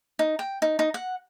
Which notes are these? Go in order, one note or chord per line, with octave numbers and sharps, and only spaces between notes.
D#4
G5
D#4
D#4
F#5